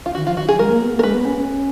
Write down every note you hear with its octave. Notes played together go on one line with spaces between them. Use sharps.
F4
D#3 F#4
F3 F4
D#3 F#4
F#3 G#4
G#3 A#4
A#3
B3
A#3
A#4
G#3 B4
B3
C#4
C#4